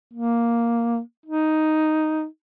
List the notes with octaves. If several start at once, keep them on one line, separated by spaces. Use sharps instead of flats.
A#3
D#4